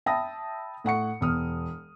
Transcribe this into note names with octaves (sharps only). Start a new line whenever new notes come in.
E5 G5 A5 B5 D#6 A#6
A2 F#5 C#6 C#7
E1 D#6 F6